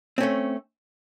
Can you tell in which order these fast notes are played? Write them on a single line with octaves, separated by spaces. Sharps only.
C4 C#4 A3